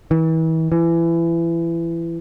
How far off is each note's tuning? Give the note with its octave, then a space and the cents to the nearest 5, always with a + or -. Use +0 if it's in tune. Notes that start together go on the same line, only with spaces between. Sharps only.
E3 -35
E3 +25